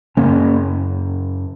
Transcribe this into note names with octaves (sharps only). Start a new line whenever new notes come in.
F#2 C#3 A#3 C#4